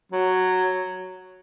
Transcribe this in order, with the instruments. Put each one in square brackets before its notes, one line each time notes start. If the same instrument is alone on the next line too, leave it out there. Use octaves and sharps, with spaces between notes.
[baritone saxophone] F#3